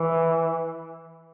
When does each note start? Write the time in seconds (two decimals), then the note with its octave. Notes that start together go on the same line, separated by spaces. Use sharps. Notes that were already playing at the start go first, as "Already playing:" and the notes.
Already playing: E3